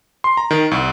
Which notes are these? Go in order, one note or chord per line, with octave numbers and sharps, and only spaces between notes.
C6
A#5
D#3
C2